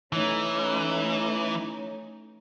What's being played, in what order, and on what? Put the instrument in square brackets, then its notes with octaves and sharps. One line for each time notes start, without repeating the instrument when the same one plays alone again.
[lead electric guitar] E3 [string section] A3 C#4 D#4